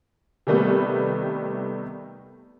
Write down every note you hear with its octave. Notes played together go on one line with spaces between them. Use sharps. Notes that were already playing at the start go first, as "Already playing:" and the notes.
C3 D#3 G3 A3 B3